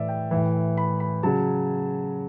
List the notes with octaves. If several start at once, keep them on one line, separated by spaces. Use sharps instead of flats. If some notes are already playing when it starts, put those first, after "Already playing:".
Already playing: A2 E3 D5 E5
G5
A2 E3
B5
B5
C#3 F#3 A5